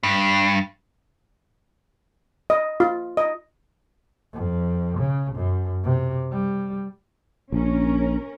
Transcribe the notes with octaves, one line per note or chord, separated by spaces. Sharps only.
G2
D#5
F4
D#5
F2
C#3
F#2
C3
G3
A#1 C#4 A#4